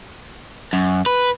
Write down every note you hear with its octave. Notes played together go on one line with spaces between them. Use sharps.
F#2
B4